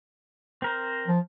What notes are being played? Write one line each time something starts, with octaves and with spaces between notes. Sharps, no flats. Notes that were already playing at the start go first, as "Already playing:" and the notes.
C4 A#4 C5
F3